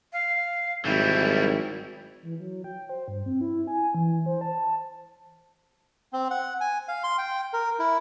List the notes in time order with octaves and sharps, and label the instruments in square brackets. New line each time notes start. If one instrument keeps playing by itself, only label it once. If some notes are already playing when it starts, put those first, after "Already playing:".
[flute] F5
[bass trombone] G#1 [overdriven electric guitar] F#3 G3 [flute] E4
[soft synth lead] E3
F#3
G5
C5
G2
C4
E4
G#5
E3
C5
A5
[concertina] C4
F#5
G#5
F5
C6
G5
A#4
E4